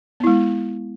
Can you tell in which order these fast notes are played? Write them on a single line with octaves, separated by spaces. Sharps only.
B3 E4 G#3